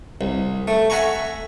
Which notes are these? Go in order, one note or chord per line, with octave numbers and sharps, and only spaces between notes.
C2
A3
E5 F#5 G#5 A#5 C#6